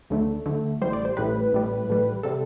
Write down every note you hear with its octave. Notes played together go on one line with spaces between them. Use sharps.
D2 D3 A3
D2 D3 A3
A1 A2 G3 C5
D5
C5
A1 A2 G3 B4
A1 A2 G3
A1 A2 G3
C3 G3 A4